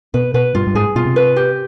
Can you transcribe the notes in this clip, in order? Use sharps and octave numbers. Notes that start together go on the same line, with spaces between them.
B2 B4
B2 B4
G2 F4
G2
G#2 G#4
B2 F4
C3
B4
G4